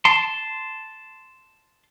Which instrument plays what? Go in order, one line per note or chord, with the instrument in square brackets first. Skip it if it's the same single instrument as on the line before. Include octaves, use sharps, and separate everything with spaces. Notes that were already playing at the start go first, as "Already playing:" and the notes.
[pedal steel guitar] A5 C6